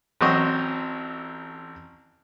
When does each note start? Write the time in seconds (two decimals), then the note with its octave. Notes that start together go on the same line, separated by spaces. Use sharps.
0.21 A1 F#3 C4 D#5 C#6